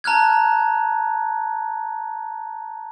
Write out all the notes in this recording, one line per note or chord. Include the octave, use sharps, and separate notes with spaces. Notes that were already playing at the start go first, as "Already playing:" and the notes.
A5 A#5 F6 F#6 G#6